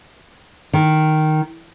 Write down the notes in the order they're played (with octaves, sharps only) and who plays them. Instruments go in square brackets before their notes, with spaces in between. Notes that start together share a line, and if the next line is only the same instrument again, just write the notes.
[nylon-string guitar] D#3